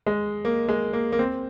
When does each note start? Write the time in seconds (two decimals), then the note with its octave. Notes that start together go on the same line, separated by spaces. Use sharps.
0.07 G#3
0.45 A#3
0.69 G#3
0.93 A#3
1.12 A#3
1.19 C4